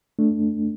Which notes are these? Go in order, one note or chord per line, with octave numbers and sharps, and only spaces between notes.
A3 D4